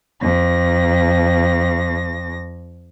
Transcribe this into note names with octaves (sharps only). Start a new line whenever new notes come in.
F2 A#6